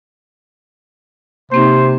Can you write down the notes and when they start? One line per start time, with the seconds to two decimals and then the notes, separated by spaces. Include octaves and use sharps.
1.52 C3 A#3 C4 D#4 C5